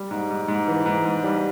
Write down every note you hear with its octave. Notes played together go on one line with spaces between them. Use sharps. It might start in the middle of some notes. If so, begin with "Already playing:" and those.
Already playing: G3
G#2
G#2
G#2
E3
G#2
G#2
G3